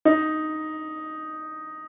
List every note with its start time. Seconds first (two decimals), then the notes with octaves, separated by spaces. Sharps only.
0.05 D#4